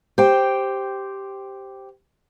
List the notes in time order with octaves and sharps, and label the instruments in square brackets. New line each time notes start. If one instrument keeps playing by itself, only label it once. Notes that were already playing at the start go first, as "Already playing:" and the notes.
[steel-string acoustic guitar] G4 C5 G5